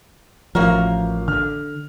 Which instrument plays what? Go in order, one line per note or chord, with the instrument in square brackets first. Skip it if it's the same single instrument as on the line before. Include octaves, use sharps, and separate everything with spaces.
[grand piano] A1 F5 [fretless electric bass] F3 [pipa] A#3 F#4 A#4
[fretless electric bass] D3 [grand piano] F6